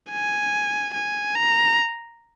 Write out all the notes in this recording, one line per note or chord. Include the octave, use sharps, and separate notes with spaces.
G#5
G#5
A#5